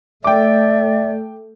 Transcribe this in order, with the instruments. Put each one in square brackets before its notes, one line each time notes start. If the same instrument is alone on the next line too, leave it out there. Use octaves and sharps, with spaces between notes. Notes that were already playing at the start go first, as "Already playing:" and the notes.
[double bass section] A3 [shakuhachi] D5 [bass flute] E5 [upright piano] G5 D6